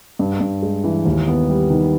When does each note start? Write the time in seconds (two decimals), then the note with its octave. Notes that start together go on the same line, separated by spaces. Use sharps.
0.19 G2
0.41 G2
0.62 G#3
0.84 E3
1.06 D#2
1.27 B3
1.49 G3
1.70 D#3